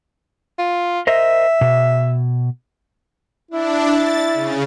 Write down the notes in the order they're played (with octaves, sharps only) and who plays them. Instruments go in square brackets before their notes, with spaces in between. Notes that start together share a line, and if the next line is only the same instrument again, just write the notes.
[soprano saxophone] F4
[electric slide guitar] A#4 C5 D#5 [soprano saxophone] E5
[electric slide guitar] B2
[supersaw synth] D4 [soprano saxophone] E4
[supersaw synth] A6
C#3